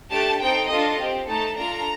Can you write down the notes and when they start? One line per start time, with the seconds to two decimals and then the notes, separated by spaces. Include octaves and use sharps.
0.11 A3 D4 G4 A5
0.40 C4 D#4 A4 G5
0.70 D4 F4 A4 D#5
0.99 C4 G4
1.28 A3 D#4 A4 A5
1.57 D4 F4 A4 A#5